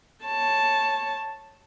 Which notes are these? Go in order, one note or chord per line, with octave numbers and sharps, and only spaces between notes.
C#5 A5